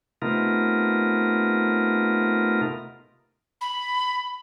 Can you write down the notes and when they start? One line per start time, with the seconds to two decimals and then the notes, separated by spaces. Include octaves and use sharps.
0.22 C3 A3 B3 D#4 F4 A#4
3.61 B5